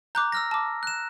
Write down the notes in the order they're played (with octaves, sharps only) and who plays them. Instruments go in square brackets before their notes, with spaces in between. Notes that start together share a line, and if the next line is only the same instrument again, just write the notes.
[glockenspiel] A#5 [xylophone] D6 F#6 G6
[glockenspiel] E6 F6 A#6
[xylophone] A5 D6
[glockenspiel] F#6 E7